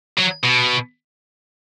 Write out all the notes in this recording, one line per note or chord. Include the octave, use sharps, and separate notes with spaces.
F#3
B2